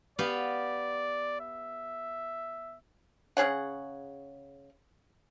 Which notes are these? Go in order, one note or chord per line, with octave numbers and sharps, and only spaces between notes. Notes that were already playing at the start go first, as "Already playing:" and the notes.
B3 G4 D5 F5
E5
C#3 G#4 C#5 F#5